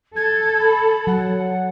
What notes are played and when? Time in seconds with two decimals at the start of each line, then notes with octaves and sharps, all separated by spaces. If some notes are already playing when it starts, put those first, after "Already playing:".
0.16 A4 G#6
0.59 B5
1.07 F#3 F#5